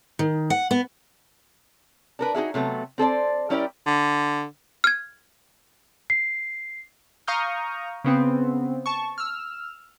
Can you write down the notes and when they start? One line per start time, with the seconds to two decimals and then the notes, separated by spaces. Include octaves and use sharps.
0.19 D#3
0.50 F#5
0.71 B3
2.19 D4 A#4 B4
2.34 D#4 F#4 G#4 E5
2.54 C3 F#3 A3 B3
2.98 C4 A4 C5 D5
3.50 G3 C#4 E4 A#4 D5 G5
3.87 D3
4.84 F6 G#6
6.10 C7
7.27 F5 A#5 C#6 D#6 F6 G6
8.04 C#3 B3 C4
8.86 A5 C#6
9.18 E6 F6